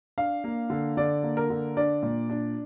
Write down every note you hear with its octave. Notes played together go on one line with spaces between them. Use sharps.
D4 F5
A#3
D3
D3 D5
A#3
A#4
D3
D4 D5
A#2
D4